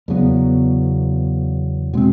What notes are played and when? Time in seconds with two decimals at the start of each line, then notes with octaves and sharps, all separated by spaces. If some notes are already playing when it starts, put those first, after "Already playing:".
0.08 E2 C#3 F#3 B3
1.93 B2 G#3 C4